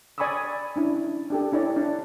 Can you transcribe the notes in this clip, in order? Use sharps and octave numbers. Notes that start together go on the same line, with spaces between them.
D5 G#5 B5 C#6 D#6 E6
C#4 D4 E4
D4 G4 A4
D4 E4 C#5 D5
D4